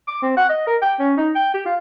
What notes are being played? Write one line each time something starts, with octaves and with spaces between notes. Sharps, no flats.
D6
C4
F#5
D#5
A#4
G5
C#4
D#4
G5
G4
F4